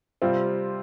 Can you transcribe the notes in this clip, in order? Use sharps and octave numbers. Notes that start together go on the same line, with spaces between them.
C3 G3 C4 F4